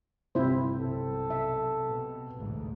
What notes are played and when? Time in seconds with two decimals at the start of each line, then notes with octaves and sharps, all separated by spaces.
0.35 G1 C2 G2 C3 E4 C5
0.79 B1 A4
1.30 E5
1.84 B2
2.35 A1 D2 G#2